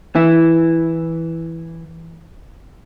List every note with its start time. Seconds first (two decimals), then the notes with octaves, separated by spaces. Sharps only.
0.15 E3 E4